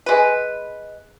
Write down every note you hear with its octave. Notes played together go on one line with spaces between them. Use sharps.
G#3 B4